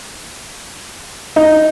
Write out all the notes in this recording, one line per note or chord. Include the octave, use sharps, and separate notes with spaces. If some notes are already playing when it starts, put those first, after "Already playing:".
D#4